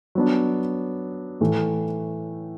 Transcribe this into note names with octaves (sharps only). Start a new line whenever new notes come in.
F#3 B3 D4
A2 E3 A3